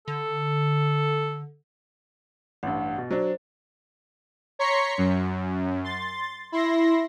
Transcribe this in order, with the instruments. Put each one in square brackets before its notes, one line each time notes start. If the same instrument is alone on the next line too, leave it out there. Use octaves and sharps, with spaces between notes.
[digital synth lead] D3 [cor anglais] A4
[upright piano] A1 G2 [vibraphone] F#5
[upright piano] B2
[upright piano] F#3 D4 [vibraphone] C5
[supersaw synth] C#5 A#5 C6 C#6 B6 C#7
F#2
C6 A6
E4 C6 A#6